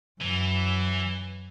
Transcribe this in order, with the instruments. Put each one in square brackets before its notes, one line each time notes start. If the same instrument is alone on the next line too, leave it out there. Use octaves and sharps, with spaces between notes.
[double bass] F#2 [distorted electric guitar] E3